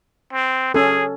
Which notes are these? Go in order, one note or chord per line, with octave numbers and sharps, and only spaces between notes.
C4
C#4 G#4 A4